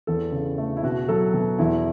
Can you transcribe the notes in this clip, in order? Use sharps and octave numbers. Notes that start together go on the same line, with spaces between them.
E2 A4
C#3
A3
E4
B2 F#4
F#3 A4
B2
E2 E4